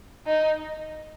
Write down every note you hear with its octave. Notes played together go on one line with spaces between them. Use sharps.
D#4